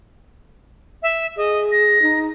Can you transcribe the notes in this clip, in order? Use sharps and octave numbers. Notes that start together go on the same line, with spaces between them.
E5
G#4 D#5
A#6
D#4